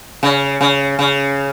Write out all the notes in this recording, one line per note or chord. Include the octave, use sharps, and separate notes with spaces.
C#3
C#3
C#3